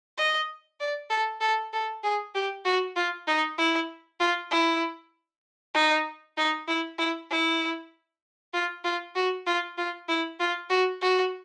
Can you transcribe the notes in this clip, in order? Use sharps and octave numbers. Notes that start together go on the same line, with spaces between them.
D#5
D5
A4
A4
A4
G#4
G4
F#4
F4
D#4
E4
F4
E4
D#4
D#4
E4
E4
E4
F4
F4
F#4
F4
F4
E4
F4
F#4
F#4